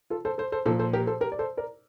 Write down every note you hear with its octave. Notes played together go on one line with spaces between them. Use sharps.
F4 A4
A4 C5
A4 C5
A4 C5
A#2 F3 A4 C5
A4 C5
G4 A#4
A4 C5
G4 A#4
D5
A4 C5
A#4 D5